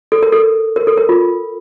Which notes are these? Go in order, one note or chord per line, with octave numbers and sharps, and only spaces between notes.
A4
A#4
A4
A#4
A4
A#4
F4